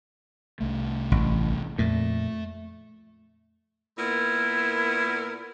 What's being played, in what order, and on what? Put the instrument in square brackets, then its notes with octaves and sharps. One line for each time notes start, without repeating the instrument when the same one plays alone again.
[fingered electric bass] C2 A3
[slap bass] A1
[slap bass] F2 A#2 [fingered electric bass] A3
[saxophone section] A#2 B3 A#4 [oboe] E4